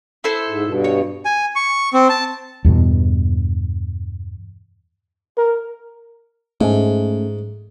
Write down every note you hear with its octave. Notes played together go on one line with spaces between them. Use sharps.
E4 A4 C5
G#2
G2 B2
C#5
G#5
C#6
C4
A5
E2 G2 B2
A#4
G#2 A3 C#4